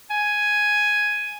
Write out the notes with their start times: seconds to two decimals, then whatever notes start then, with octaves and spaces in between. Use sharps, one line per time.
0.10 G#5